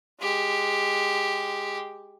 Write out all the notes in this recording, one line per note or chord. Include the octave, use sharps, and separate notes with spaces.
G#3 G4